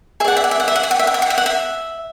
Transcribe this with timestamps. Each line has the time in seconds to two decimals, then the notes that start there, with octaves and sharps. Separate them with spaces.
0.20 G#4 E5
0.24 D5 F#5
0.37 E5
0.44 F#5
0.51 E5
0.60 F#5
0.68 E5
0.76 F#5
0.83 E5
0.91 F#5
0.99 E5
1.07 F#5
1.14 E5
1.22 F#5
1.30 E5
1.38 F#5
1.46 E5